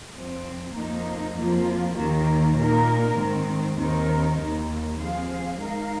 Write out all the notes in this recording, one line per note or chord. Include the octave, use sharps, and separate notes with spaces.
F2 F3 C4
F2 F3 A#3 D#4
F2 F3 A#3 F4
D#2 D#3 A#3
A#2 A#3 D#4 A#4
G#2 D#3 C4
D#2 D#3 C4 D#4 A#4
D#2 D#3 A#3
F3 C4 G#4 F5
G#3 D#4 A#4 F5